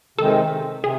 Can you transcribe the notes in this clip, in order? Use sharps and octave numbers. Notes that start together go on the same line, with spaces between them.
C3 D#3 G#3 C4 A4
C3 G#4